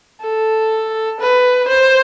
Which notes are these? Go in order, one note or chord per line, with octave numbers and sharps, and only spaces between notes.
A4
B4
C5